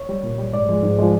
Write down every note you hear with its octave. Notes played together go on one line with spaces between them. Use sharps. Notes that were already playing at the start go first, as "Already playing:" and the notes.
Already playing: C#5
G3
A#2
G3
G#2 D5
F3 G#3
G#2
F3 G#3